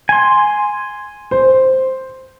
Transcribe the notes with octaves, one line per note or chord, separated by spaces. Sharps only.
G#5 C6
C5